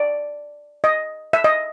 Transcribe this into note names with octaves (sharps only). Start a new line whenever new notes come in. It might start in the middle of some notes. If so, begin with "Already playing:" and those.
Already playing: D5
D#5
E5
D#5